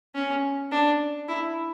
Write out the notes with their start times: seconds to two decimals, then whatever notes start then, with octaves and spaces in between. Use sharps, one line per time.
0.15 C#4
0.72 D4
1.28 E4